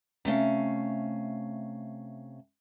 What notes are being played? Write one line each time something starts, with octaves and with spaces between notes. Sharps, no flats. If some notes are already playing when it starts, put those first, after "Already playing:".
C3 A3 C#4 F5